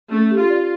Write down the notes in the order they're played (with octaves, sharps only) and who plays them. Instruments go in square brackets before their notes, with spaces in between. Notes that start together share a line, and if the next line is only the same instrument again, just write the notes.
[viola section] A3 [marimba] C#4
[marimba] G4
[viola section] F4
[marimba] D5